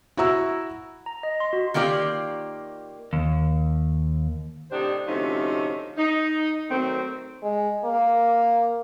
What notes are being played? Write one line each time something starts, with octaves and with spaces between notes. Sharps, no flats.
E4 F#4 A#5 E6
A#5
D#5
C6
F#4
D#3 A#3 F4 G4 D5
D#2
A2 C3 D4 D#4 G4 C5
D2 C3 F3 A3 C#4 D#4
D#4
D#3 F#3 A3 C4
G#3
A#3